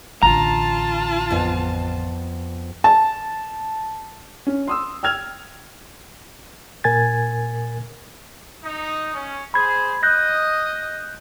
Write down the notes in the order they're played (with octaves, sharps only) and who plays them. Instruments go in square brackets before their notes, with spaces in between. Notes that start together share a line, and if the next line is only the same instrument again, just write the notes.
[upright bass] A1 D3 [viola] F4 A5 [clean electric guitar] A#5
[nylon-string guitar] F2 B3 G#5
[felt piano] A5
[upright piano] C#4
C6 D#6 E6
G5 E6 F6 G#6 F7
[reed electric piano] A#2 A#4 G#5 G#6 A6
[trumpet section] D#4
C#4
[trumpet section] G#4 C5 [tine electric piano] B5 G#6
[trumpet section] D#5 [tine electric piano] F#6 G6 A#6